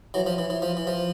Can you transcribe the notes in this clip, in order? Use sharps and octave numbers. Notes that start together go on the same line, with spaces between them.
E3 F#3
F3
E3
E3
F3
E3
F3